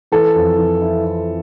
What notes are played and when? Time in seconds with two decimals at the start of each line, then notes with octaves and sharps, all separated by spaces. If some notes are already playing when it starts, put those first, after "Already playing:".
0.12 E3 A4
0.36 F2
0.58 E3
0.82 E4
1.05 E4